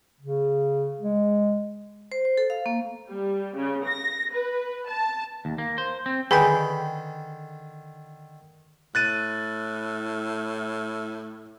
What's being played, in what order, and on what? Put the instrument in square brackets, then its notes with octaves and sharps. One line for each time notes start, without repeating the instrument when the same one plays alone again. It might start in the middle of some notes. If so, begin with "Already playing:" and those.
[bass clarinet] C#3
G#3
[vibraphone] C5
C5
A4
F5
A#3
[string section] G3
C#3
A#6
B4
A5
[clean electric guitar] D#2
A#3
C5
C4
[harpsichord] D3 D#3 [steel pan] G#4 G5 B5 [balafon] B4 G#5
[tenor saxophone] A2 [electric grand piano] F#6 A6 D#7